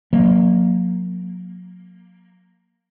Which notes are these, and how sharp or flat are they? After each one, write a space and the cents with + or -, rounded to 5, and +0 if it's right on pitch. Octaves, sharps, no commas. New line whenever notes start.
F#3 -35 A#3 +0